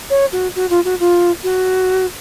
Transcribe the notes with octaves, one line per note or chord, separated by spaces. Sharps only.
C#5
F#4
F#4
F4
F#4
F4
F#4